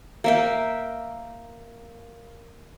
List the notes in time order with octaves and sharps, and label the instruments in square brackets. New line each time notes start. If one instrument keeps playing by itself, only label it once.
[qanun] A#3 E5 G5